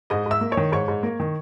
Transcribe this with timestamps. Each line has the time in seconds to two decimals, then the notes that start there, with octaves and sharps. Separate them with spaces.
0.10 G#2 D#5 D#6
0.26 G#2 E5 E6
0.41 A#3
0.52 C#5 C#6
0.57 D#3
0.72 G#2 C#5 C#6
0.88 G#2
1.03 A#3
1.20 D#3